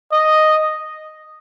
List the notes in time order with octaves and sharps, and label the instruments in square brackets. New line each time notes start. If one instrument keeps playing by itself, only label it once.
[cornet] D#5